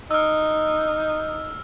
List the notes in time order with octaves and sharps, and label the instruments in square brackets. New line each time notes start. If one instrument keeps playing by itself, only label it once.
[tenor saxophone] D#4 [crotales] E6 F6